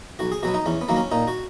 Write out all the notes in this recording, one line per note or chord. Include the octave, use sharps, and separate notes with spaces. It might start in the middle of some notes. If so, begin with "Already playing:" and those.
B1 F#4
G#4
B2 F#3 B3 F#4
D#4
E2 C#4
B3
D#3 F#3 A#3
C#4
A#2 D#4
F#4